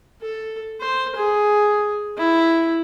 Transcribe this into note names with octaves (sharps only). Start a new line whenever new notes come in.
A4
C5
G#4
E4